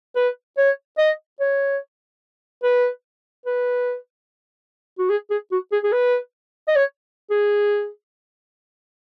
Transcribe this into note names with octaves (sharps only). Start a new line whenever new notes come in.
B4
C#5
D#5
C#5
B4
B4
F#4
G#4
G#4
F#4
G#4
G#4
B4
D#5
C#5
G#4